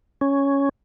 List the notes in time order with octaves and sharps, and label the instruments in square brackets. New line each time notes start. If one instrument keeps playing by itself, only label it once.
[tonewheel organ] C#4